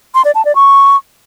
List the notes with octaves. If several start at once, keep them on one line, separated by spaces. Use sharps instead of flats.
C6
D5
A5
D5
C#6